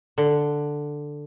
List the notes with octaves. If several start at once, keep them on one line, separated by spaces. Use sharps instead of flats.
D3